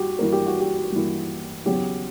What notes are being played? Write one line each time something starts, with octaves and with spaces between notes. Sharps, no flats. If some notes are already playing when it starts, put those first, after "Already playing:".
Already playing: G2 F#4 G4
G2 E3 A#3 A#4
G4
F#4
G4
G2 E3 A#3
E2 C#3 F#3 B3 G4